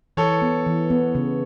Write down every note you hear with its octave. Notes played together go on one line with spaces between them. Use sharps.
E3 A4 C#5
B3
E3
B3
C#3